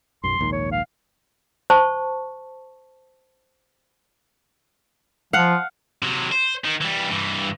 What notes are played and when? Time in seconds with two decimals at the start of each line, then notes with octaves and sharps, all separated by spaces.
0.24 B1 F#2 C6
0.39 A#1 D#2 G#2
0.52 C#5
0.72 F5
1.70 C5 A5 C#6
5.33 F3 F5 F#5
6.03 C3 F#3
6.32 C5
6.64 D#3
6.81 E3 G3
7.11 G2 E3